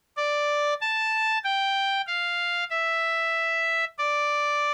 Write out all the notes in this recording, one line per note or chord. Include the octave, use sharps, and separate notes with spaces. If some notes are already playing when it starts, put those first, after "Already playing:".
D5
A5
G5
F5
E5
D5